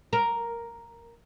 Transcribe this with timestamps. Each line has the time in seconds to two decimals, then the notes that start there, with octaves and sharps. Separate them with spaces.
0.13 A#4